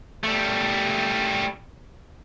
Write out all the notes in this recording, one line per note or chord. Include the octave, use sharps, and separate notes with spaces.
G3 A3